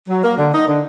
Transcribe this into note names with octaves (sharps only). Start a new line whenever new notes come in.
F#3
A#3
D3
D#4
D3